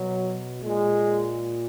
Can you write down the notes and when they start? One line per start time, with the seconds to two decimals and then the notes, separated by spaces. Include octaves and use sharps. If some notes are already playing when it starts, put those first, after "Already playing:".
Already playing: B2 F#3
0.62 A#2 G#3